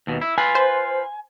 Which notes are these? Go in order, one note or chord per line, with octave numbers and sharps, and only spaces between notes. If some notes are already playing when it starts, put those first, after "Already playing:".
D#2 B2
E4
F4 B4 G#5
C5